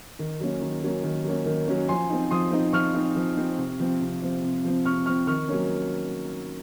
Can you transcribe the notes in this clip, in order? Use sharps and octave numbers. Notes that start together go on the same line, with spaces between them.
D#3
F#3 A#3 C#4
D#3
F#3 A#3 C#4
D#3
F#3 A#3 C#4
D#3
F#3 A#3 C#4
F3 G#5 C6
C4 D#4
F3 C6 D#6
C4 D#4
F3 C#6 F6
C4 D#4
F3
C4 D#4
C3
F3 C4
C3
F3 C4
C3
F3 C4
C3 C#6 F6
F3 C4 C#6 F6
D#3 C#6 F6
F#3 A#3 C#4